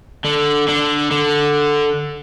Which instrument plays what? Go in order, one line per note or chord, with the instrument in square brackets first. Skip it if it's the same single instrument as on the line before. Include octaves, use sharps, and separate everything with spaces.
[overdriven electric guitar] D3
D3
D3